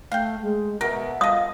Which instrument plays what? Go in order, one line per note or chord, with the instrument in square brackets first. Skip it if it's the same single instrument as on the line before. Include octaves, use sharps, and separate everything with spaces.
[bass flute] A3 [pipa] F5 G5
[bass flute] G#3
[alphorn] B2 [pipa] A#4 [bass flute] E5
[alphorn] F4 [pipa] A4 D#5 [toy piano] D#6